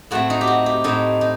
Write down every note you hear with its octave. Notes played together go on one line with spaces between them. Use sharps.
A2 A3 C4 F#4
D#4
G4
F#4
G4
A2 A3 C4 D#4
D#4